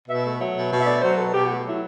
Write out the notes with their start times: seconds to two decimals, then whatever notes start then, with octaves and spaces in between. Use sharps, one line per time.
0.09 B2 E5
0.25 A3
0.40 F#3 E5
0.56 B2
0.72 B2
0.81 E5
0.87 A3 D5
1.02 F#3 C5
1.18 B2 A4
1.34 B2 G4
1.45 A3 F#4
1.65 F#3 E4